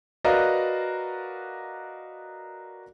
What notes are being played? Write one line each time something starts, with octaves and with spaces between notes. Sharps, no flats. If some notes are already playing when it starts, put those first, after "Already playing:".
F#4 A#4 B4 D5 D#5 F5